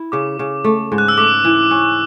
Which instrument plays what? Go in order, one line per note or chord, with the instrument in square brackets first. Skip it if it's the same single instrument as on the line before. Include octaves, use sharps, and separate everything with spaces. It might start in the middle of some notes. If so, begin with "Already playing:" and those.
Already playing: [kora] E4
[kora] C#3 [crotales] D6
[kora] C#3
A3
G#2
[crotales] F#6
E6
[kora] A3 [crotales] D6
[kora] E3
C#4